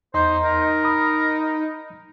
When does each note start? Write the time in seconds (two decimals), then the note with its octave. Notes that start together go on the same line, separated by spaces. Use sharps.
0.14 E2 D#4 C5 D#5 C6
0.43 A#4
0.84 B5 D#6